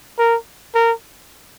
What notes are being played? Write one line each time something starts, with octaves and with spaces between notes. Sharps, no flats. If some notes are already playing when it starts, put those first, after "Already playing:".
A#4
A#4